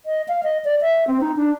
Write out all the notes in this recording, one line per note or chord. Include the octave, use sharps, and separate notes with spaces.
D#5
F5
D#5
D5
E5
C4
D#4
D4